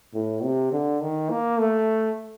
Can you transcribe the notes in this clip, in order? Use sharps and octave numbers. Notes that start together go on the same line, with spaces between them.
A2
C3
D3
D#3
A#3
A3